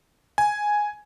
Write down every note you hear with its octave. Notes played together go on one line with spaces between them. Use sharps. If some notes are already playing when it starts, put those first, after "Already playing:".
G#5